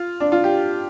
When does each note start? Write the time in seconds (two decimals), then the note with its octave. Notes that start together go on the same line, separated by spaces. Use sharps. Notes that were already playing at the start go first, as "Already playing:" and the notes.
Already playing: F4
0.20 D4
0.32 F4
0.44 G4